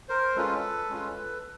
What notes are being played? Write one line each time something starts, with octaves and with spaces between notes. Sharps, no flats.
A#4 C5
G#3 C#4 F4 A4 B4
G#3 C#4 F4